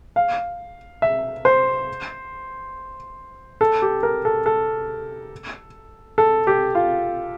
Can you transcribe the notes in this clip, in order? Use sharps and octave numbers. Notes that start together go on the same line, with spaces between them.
F5
E5
C5
A4
G4
A#4
A4
A4
A4
G4
F4